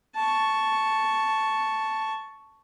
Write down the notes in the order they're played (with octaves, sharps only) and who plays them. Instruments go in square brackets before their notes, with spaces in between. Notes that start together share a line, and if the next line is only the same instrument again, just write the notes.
[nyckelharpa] A5 C#6